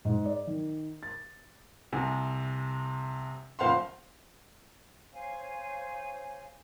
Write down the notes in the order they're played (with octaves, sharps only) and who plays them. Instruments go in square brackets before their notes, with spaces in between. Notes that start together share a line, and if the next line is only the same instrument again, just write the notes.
[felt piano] G#2
D5
D#3
A6
C2 C3 G#5
F#1 A#2 C5 F5 F#5 C6
[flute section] C5 C#5 F5 G#5